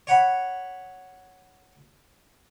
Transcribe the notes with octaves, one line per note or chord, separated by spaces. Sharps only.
C#5 F#5 B5